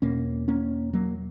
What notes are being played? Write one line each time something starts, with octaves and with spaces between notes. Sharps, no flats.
E2 B2 A#3 C#4
A#3 C#4
F#3 A#3